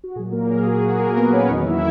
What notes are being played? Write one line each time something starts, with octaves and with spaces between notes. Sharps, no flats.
F#4
A#2 F#3 G#4
A#3 A#4
G#4
F#4
G#4
A#3 A#4
B3 B4
C#4 C#5
E2 D#3 F#3 D#4 D#5
E4 E5